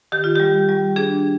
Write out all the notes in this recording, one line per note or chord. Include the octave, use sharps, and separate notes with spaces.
D#3 G4
F4
G3 G4
G3
D4 G#4